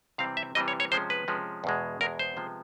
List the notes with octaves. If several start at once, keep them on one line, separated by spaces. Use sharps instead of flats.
C3 E3 G3 C4 F5
E5
C3 E3 G3 C4 D#5
C#5
C#5
C3 F3 G#3 C#4 C5
B4
C3 F3 G#3 C#4
E2 B2 G#3
E2 B2 G#3 A#4
C5
C3 F3 G#3 B3